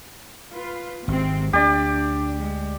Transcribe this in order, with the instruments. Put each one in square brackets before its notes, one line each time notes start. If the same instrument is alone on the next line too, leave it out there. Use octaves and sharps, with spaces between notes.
[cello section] F4 B4
[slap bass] G#1 [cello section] C3 G#3 C4
[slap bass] D2 [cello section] D4 [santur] G4 D5
[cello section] G#3